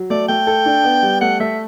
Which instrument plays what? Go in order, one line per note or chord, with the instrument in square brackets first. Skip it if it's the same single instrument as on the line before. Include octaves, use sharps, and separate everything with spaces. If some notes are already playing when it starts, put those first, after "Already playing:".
Already playing: [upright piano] F#3
[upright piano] A3 [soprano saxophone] D5
[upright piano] A3 [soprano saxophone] G5
[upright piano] A4
D4
B3
G3
[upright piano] A3 [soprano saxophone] F#5
[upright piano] A3 [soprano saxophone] E5